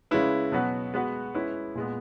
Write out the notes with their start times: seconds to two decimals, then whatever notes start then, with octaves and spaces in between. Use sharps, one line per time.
0.11 C#3 G#3 C#4 E4 B4
0.52 B2 F#3 B3 F#4 B4
0.94 G#3 B3 F#4 B4
1.35 G#3 C#4 E4 B4
1.75 A#2 G#3 B3